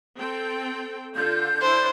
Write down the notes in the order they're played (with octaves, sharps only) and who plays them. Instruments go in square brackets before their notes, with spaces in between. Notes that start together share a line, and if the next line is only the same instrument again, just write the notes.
[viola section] C4 A4 G5
[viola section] D3 F4 A4 [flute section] G6
[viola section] D4 E4 [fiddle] C5